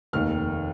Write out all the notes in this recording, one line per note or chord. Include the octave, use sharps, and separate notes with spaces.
F1 D#2 D#3 F6